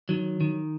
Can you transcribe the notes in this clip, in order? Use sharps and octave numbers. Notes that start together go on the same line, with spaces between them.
D#3 F#3
D#3